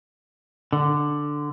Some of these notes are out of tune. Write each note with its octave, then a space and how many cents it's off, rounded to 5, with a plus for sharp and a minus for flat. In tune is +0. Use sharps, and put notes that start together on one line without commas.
D3 +5